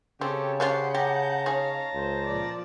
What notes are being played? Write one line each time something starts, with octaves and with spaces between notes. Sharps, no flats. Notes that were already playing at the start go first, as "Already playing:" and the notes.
C#3 C4 C#4 G4 A4
C#4 D4 F4 G4 C5 F#5 G6
G4 A5 A#5
D#4 G#4 C#5 F5
C#2 C5
A#2 F3 D5